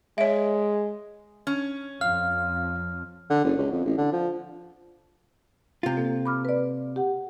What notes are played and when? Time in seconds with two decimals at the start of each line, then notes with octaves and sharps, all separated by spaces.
0.18 G#3 C#5 E5
1.47 C#4
2.01 F2 F5 F6
3.30 D3
3.44 F#1
3.57 C#2
3.71 F2
3.85 A1
3.98 D3
4.13 F3
5.83 C3 F4
5.97 A#3 A4
6.25 B5 D6 F6
6.45 B4 D5
6.96 G4 F#5